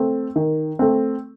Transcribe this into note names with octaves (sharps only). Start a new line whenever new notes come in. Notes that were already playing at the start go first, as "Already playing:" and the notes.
Already playing: A3 C4
D#3
A3 C4